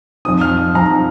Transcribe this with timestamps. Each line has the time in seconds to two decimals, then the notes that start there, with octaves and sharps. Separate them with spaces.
0.25 F2 F3 C4 D#4 D#6
0.41 F6
0.75 F2 F3 C4 D#4 A#5